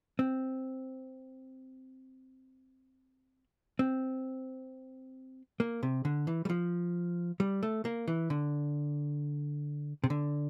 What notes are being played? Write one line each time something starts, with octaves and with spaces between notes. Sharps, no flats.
C4
C4
A#3
C3
D3
E3
G3
F3
G3
A3
A#3
E3
D3
C3
D3